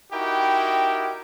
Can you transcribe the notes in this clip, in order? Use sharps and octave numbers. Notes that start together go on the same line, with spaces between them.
D#4 E4 F#4 G4 A#4 G5